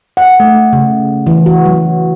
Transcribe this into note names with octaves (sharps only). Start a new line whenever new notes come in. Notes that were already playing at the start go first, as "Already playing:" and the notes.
F#5
A3
C#3
E3
F#4
F#3